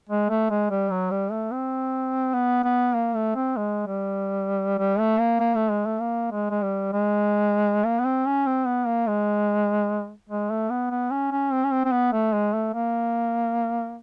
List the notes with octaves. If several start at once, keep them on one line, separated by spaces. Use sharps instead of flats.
G#3
A3
G#3
G3
F#3
G3
A3
C4
B3
B3
A#3
A3
C4
G#3
G3
G3
A3
A#3
A#3
A3
G#3
A3
A#3
G#3
G#3
G3
G#3
A#3
B3
C4
C#4
C4
B3
A#3
G#3
G#3
A3
B3
B3
C#4
C#4
C4
C#4
C4
C4
B3
A3
G#3
A3
A#3